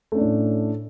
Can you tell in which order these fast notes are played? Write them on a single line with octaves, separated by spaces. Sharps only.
A3 C#4 D4 A2